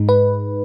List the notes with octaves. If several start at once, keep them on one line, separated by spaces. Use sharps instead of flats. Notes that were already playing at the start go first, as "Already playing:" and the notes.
Already playing: G#2 G#3 D#4
B4